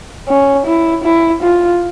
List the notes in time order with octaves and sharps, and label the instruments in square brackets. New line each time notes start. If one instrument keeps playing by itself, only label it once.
[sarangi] C#4
E4
E4
F4